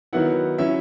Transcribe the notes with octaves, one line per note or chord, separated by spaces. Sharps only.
D#3 F#3 B3 E4 F#5
F#3 C#4 E4 E5